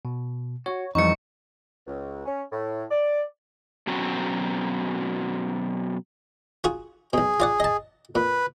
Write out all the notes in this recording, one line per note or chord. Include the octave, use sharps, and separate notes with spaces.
B2
F#4 C#5
F2 E3 F3 G3 D#4 C#6 C#7
C#2
C#4
A2
D5
B2 F#3 C4 C#4
F4 F#4 G#4
B1 B2 G#4
F4 D5 F#5
D#5 A5
A#2 B4